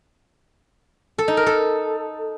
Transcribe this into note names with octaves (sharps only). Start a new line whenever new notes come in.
A4
D#4
A#4
A4